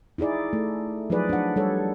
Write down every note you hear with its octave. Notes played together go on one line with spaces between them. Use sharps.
D#4 E4 G#4 D5
A3
F3 F#3 D#4 G#4 B4 D5
D4 F#5
G3 A4 C#5